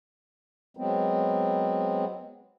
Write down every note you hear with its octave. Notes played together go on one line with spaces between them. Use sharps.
F#3 G#3 B3 C4